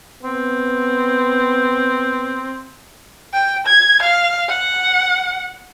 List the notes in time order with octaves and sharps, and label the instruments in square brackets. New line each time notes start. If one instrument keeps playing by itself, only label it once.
[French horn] B3 [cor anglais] C4
[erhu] G5
G#6
F5
F#5